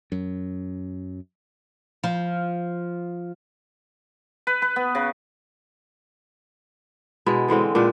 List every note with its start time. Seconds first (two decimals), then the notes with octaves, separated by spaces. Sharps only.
0.12 F#2
2.04 F3
4.47 B4
4.62 B4
4.76 B3
4.95 C#3
7.26 B2 G#3 E4
7.48 D3 E3 G#3 C4
7.75 A#2 G#3 D4 G4